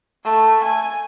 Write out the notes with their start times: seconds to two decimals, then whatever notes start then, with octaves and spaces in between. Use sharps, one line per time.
0.24 A3
0.63 G#5